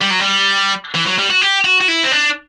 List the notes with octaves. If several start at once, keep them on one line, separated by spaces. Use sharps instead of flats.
G3
F#3
G3
E3
F#3
G3
F#4
G4
F#4
F#4
E4
C4
D4